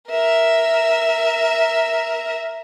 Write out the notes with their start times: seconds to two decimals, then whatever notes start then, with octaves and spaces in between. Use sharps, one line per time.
0.10 A#4 E5